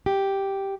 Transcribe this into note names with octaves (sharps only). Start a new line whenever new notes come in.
G4